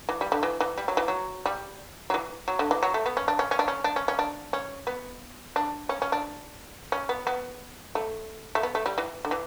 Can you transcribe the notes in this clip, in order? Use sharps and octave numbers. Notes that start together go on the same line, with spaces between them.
E3
G3
D3
E3
E3
G3
F#3
E3
F#3
G3
F#3
E3
F#3
D3
E3
F#3
A3
B3
C#4
D4
C#4
C#4
D4
C#4
D4
C#4
C#4
D4
C#4
B3
D4
C#4
C#4
D4
C#4
B3
B3
A3
A3
B3
A3
G3
E3
D3
E3